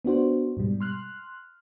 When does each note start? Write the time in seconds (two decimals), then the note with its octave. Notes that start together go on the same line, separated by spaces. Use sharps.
0.05 B3 D4 F#4 C5
0.57 G#2 B2 G3
0.80 C6 F6 F#6